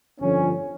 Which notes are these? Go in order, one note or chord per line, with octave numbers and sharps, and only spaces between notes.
G1 F2 D3 F3 C#4